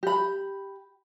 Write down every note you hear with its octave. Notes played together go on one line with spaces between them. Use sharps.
G4 B5